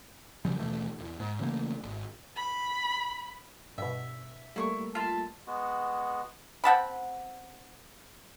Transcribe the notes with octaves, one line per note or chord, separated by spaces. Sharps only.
F#2 C#3 F3 G3
D#2 B2 E3 A3
D#1 E2
G#2
C#3 E3 A3 A#3
G#1
B5
G2 B2 E5
G3 A3 A#3 E4 C6 C#6
F4 E5 A5 C6
G#3 B3 F#4
C4 F#5 A5 B5